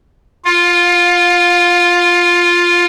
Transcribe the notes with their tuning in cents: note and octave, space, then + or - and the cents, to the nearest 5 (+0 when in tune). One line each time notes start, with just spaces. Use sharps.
F4 +0 F5 +25